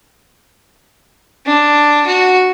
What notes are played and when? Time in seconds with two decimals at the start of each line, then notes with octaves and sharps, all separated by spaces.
1.46 D4
2.07 F#4